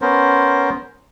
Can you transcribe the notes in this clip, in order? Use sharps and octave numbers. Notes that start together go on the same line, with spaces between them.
B3 C#4 A#4 C5